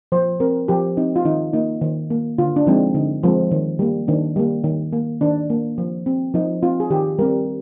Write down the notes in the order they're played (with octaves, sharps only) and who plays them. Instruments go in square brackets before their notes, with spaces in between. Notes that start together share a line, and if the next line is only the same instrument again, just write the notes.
[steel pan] F3 C5
C4 A#4
F3 G4
C4 D#4
F4
D#3 D#4
A#3 D#4
D#3
A#3
D3 F4
D4
F3 G#3 C4 D#4
D3 D#4
F3 G#3 C4
D#3
G3 A#3
D#3 D4
G3 A#3
D#3
A#3
D#3 D4
A#3
F3
C4
F3 D#4
C4 F4
G#4
D#3 G4
G3 C4 A#4